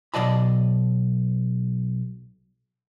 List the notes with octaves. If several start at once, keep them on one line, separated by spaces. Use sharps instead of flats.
B1 F#2 D5 D#5 A5 B5